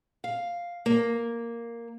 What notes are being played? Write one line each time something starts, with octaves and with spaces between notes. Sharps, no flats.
F5
A#3